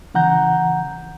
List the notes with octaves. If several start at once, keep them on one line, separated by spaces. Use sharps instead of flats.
C#3 E3 F#5 A#5 G6